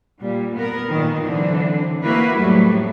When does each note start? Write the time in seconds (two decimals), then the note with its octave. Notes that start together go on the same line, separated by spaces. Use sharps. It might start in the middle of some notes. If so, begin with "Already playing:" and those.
0.20 A#2 G3
0.55 B3 A#4
0.89 A#2 D#3
1.23 D3 E3 F#3 C4 D4
2.04 A#3 E4 F#4 B4
2.38 F2 A2 F#3 G3 A3